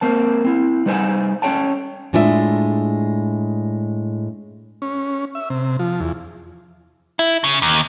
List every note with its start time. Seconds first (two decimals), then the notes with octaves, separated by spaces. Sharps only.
0.01 A#3 C4 A5
0.45 C4 E4
0.86 G3 D#4 B4 C5 G#5
1.42 C#4 A4 C#5 G5 A5
2.13 A2 G#3 D4 F4 A4 E5
4.82 C#4
5.35 E5
5.50 C3
5.79 F3
6.00 E2
7.19 E4
7.44 C#3
7.62 D#2